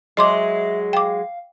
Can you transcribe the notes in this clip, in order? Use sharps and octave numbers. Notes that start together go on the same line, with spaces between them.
F#3 G#3 D#5 E5 C6 D6
F5 G5 D6